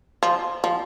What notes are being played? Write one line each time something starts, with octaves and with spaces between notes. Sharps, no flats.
F3
F3